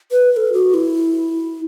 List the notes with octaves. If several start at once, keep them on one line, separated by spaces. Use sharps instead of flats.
B4
B4
A4
F#4
E4